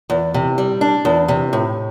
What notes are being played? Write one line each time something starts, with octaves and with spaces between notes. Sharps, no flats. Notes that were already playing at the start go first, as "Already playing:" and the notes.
E2
C3
G3
D4
E2
C3
A2